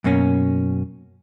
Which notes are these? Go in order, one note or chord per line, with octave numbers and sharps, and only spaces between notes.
F#2 B2 A#3 C#4